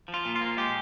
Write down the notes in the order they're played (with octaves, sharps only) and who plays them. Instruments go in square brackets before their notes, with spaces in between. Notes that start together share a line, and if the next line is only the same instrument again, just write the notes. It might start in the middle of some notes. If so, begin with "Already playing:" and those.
[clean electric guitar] F3
F4
A#2
F4
A#3
G#3 G4